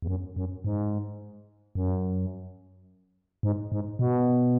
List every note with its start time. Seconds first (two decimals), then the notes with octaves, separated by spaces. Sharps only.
0.02 E2
0.07 F#2
0.36 F#2
0.64 G#2
1.75 F#2
3.43 G#2
3.72 G#2
3.99 B2